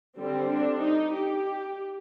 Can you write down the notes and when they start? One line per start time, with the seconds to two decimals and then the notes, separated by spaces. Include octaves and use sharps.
0.17 D3 G3 C4
0.49 D4
0.81 D#4
1.13 G4